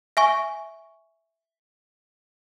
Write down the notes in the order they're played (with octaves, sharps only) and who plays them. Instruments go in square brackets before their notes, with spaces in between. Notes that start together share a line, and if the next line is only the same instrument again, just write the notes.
[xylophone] E5 G#5 C#6